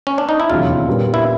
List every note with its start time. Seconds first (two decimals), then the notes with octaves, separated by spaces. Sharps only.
0.07 C#4
0.18 D4
0.29 D#4
0.40 E4
0.50 E1 D#2 C#3 F#3 F4
0.88 A#2 G3 B3
1.14 E4